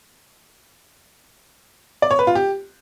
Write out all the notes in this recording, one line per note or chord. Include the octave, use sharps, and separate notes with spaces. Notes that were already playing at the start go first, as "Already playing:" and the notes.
D5
C#5
B4
F4
G4